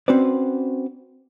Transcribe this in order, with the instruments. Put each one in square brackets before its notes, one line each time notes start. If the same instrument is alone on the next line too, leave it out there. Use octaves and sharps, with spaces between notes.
[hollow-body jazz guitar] C4 C#4 F#4 B4 C5 D5